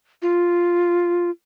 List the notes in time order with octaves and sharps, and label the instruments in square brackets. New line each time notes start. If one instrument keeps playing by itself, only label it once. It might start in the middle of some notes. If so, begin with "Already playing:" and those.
[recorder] F4